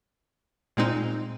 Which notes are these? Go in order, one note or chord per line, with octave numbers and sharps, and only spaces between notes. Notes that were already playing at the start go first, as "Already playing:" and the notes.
A#2 G#3 C4 D#4